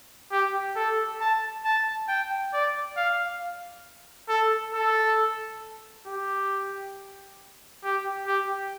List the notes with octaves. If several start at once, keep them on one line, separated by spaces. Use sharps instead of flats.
G4
A4
A5
A5
G5
D5
F5
A4
A4
G4
G4
G4